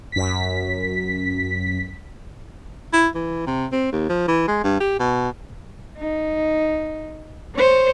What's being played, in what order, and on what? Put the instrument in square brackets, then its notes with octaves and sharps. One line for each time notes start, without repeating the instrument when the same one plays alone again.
[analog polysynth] F#2 B6
[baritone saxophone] E4
E3
C3
C4
D#2
F3
E3
G#3
G2
G4
B2
[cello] D#4
C5 C#5